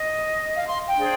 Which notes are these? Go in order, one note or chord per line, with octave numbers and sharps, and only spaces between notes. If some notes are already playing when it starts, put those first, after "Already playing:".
Already playing: D#5
F5
C6
G5
D4 G#4 C5